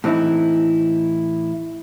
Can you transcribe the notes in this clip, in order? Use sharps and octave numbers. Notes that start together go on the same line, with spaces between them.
A2 E3 C4 D#4 E4